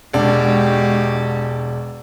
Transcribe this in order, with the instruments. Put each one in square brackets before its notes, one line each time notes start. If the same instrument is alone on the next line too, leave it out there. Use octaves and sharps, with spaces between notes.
[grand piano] E1 D4 [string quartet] G#3 F#4 G4